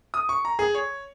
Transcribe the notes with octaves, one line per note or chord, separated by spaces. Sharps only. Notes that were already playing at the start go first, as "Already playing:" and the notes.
D#6
C#6
A#5
G#4
C#5